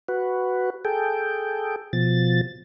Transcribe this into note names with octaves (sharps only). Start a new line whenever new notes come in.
F#4 B4
G#4 A4 G5
B2 F3 A6